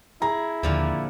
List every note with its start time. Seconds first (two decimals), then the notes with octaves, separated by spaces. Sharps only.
0.22 E4 G#4 A#5
0.63 D#2 A#2 D3 F3